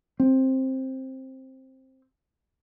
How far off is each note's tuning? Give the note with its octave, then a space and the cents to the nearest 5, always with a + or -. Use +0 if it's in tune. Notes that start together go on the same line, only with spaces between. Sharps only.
C4 +10